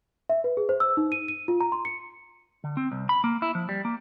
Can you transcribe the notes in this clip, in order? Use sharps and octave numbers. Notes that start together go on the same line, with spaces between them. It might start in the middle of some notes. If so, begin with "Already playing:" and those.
E5
B4
G#4
C5
E6
D#4
D#7
D#7
F4
A#5
C6
C#7
D3
C4
C2
B5
A#3
E4
F3
G3
A#3